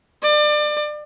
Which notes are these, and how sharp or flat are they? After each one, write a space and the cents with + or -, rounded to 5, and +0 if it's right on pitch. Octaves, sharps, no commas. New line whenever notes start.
D5 +30